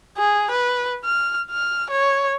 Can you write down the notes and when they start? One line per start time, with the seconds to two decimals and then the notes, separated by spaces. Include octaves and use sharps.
0.18 G#4
0.51 B4
1.05 F6
1.51 F6
1.90 C#5